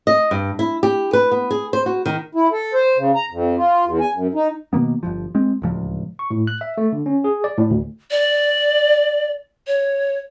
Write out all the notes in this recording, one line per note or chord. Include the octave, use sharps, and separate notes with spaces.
D#5
G2
E4
G4
B4
B3
G#4
C5
F#4
D#3
E4
A4
C5
C#3
A#5
F2
F4
E2
G#5
F#2
D#4
B2 D#3 A#3 B3
G1 C2 F3
G#3 C4
D1 C#2 F3
C#6
A2
F#6
E5
A3
D3
C#4
G#4
D5
A2
D2
D5
C#5